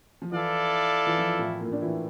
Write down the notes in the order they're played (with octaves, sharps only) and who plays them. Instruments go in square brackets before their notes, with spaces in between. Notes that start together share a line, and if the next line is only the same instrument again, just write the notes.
[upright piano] F3
[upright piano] E3 [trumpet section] E4 A4 D5 F5
[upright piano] E3
F3
A2 A3
A#2 A#3
D4
E3 E4